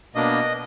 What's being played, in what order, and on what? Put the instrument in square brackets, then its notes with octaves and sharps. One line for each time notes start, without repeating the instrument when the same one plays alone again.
[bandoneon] B2 A#3 D4 D#5